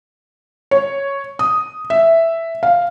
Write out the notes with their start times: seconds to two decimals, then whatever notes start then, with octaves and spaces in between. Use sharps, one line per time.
0.71 C#5
1.39 D#6
1.90 E5
2.63 F5